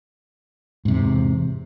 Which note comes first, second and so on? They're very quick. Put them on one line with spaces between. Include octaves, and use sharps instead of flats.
G#2 C3 E2